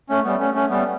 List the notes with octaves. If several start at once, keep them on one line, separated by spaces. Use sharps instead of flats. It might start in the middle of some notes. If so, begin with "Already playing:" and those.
A3 C#4
G3 B3
A3 C#4
A3 C#4
G3 B3